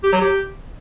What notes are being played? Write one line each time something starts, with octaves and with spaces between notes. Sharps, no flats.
G4
F#3
G4